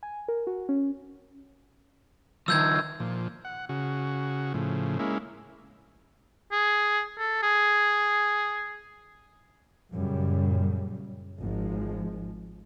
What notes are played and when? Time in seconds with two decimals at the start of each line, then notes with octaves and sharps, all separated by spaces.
0.03 G#5
0.28 A#4
0.47 F#4
0.69 C#4
2.48 D#3 F3 E6 G6 G#6
3.00 A#2 F3
3.45 F#5
3.69 C#3 F#4
4.54 A2 C#3 F3
4.99 G#3 A#3 C#4 E4
6.52 G#4
7.19 A4
7.43 G#4
9.92 F#2 A#2 C#3 G3
11.40 G#1 F3 G#3